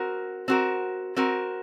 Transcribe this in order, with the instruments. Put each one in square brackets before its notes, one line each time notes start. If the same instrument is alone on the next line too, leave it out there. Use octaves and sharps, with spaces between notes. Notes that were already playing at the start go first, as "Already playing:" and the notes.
Already playing: [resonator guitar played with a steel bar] C4 F#4 A#4
C4 F#4 A#4
C4 F#4 A#4